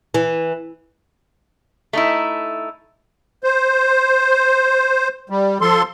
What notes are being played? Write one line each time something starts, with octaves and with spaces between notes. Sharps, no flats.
E3
A3 D#4 E4
C5
G3
F3 A4 C6